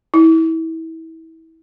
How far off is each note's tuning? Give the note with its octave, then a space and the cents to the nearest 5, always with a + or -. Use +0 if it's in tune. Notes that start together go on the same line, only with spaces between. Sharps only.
E4 -30